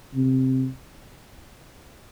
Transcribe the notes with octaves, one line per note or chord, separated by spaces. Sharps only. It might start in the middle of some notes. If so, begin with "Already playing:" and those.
C3